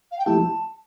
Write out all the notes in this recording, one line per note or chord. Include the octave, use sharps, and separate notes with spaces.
F5
G5
F3 A3 E4 G4 A5